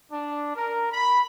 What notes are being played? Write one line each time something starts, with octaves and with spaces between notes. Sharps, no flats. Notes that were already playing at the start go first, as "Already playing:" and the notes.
D4
A#4
B5